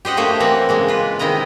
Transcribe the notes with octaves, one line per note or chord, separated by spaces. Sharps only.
G4 C5 D#5 F#5
A3 A#3 G4 C5 C#5
E3 C4 A#4 F#5
C#3 G#3 A#3
F4 B4
C3 D#3 E4 D#5 A#5